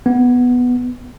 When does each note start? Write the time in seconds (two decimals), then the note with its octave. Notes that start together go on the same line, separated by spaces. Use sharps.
0.06 B3